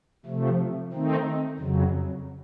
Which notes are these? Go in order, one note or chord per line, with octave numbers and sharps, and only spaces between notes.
C3 F3 A3
D#3 A3 C4 D#4
F2 C#3 F#3